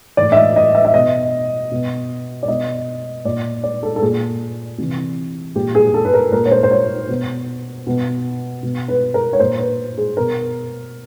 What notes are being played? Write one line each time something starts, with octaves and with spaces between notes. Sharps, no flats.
A2 E3 D5
E5
D#5
D#5
E5
E5
B2 D#5
B2
D5
B2 D#5
A#2 D5
D5
A4
A4
A#2 G#4
C3 E3
A#2 G4
G#4
A4
B4
A#4
A#2 A#4
C#5
C5
C5
C#5
B2
B2
B2
B4
A#4
C#5
A#2 C5
B4
G#4
B2 A#4